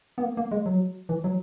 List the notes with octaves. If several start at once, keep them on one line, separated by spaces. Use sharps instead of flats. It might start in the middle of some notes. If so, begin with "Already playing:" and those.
B3
A#3
A#3
G#3
F#3
E3
F#3